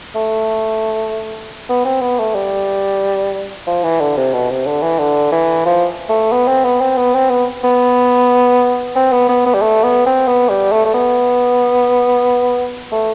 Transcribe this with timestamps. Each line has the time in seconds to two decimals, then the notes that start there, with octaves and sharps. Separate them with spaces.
0.15 A3
1.70 B3
1.85 C4
2.01 B3
2.19 A3
2.35 G3
3.67 F3
3.84 E3
4.01 D3
4.17 C3
4.33 B2
4.50 C3
4.67 D3
4.82 E3
4.99 D3
5.32 E3
5.66 F3
6.09 A3
6.32 B3
6.47 C4
6.64 B3
6.81 C4
6.97 B3
7.14 C4
7.30 B3
7.64 B3
8.96 C4
9.12 B3
9.29 B3
9.46 B3
9.54 G3
9.62 A3
9.84 B3
10.06 C4
10.28 B3
10.49 G3
10.72 A3
10.85 A3
10.94 B3
12.92 A3